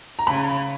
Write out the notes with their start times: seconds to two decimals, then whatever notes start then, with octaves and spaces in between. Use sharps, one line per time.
0.19 A#5
0.27 C#3 B5